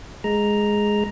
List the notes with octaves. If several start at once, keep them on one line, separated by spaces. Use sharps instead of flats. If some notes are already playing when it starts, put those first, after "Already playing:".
G#3 A#5